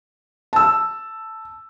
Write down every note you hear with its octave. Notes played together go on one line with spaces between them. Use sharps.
A5 E6